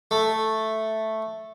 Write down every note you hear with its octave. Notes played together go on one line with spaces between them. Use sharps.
A3